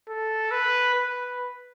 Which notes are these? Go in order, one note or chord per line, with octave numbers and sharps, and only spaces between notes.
A4
B4
B4